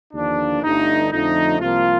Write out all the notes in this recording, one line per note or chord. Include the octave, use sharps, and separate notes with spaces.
D#2 D3 F3 A#3 D4
G1 G2 D3 A3 D#4
F2 D3 F3 A3 D#4
C2 C3 F3 A#3 F4